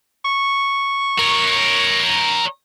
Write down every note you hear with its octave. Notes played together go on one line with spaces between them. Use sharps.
C#6
A#4 C#5